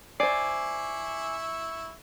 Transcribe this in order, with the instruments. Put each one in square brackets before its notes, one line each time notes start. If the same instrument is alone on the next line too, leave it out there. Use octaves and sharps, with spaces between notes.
[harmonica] E4 E5 C#6 [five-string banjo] C5 D5 [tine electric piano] G#5 D6 C7